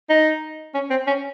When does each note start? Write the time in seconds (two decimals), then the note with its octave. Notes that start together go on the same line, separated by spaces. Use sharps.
0.09 D#4
0.74 C#4
0.90 C4
1.07 C#4